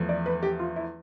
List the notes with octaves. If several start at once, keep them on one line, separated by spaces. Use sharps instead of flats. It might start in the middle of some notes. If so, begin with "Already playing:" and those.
Already playing: E2 F3 A3
D5
B4
G4
F4
E4